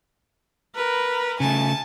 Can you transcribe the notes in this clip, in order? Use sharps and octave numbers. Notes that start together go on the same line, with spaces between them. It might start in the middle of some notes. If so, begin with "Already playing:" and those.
A#4 B4
C#3 A3 G#5 A5